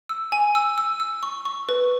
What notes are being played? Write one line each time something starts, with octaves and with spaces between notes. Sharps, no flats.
E6
G#5
E6
E6
E6
C#6
C#6
B4